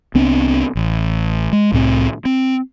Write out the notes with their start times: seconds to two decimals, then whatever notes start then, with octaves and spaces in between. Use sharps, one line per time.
0.14 C2 B3 C4 D4
0.75 A1
1.53 G#3
1.72 C2 A2 G#3 C4
2.25 C4